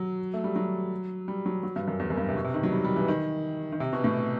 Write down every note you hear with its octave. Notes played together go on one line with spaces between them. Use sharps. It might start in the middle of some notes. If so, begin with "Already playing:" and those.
Already playing: F#3
A3
G3
F#3
G3
F#3
F#3
G2
F#2
E2
F#2
G2
C3
B2
C3
D#3
F#3
G3
G3
E3
D#3
D#3
C3
B2
A2